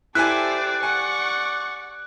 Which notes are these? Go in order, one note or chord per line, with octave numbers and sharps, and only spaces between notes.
E4 G4 A4 C5 D5 G#5 F#6
D5 F#5 G#5 C#6